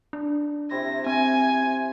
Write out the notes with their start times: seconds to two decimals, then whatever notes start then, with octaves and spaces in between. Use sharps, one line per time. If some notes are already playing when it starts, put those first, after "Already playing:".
0.13 D4
0.71 C3 E4 A#6
1.06 C4 G#5